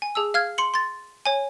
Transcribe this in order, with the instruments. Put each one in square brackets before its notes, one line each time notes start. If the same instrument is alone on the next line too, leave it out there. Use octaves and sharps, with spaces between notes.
[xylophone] G#5
G#4 A5 E6
F5 F6 G#6
C6 C#7 F#7
C6 A6
C#5 G#5